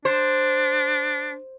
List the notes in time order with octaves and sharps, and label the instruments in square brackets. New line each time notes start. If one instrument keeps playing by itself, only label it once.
[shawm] D4 [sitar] C5